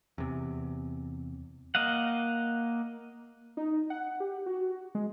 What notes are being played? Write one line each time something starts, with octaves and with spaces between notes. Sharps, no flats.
E2 C3
A#3 D#5 F5 F#5
D#4
F#5
G4
F#4
G#3